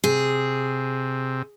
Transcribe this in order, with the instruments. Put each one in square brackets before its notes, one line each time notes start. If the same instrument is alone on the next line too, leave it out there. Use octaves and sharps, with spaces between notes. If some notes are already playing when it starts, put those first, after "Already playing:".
[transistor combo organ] C3 [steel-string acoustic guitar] G#4